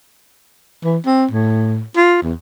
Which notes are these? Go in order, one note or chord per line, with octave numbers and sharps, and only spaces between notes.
E3
C4
A2
F4
E2